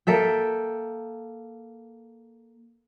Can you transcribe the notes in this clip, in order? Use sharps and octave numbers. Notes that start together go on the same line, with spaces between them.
A#3 A4 E5 G5